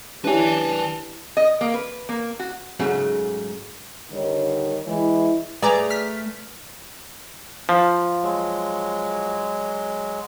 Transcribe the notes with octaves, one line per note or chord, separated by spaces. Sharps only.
C#4 D4 E4 G4 B4 G#5 A5
D#5
A#3
B4
A#3
F#4
G#2 C#3 F#3 A3
D3 D#3 G3 D#4 C#5
E3 G#3 E4
A3 G#4 B4 D5 G#5 A#5 D6
F6 B6
F3
F#3 G#3